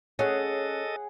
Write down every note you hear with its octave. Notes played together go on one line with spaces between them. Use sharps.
C#4 G#4 A4 D#5 F#5